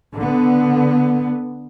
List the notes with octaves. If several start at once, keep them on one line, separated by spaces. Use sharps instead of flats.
D3 B3